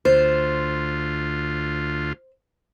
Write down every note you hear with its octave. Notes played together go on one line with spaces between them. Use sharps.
D2 F4 C5